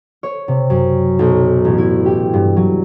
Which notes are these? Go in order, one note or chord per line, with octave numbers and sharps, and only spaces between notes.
C#5
C3
F#2
B1
A1
E4
G4
G2
F#3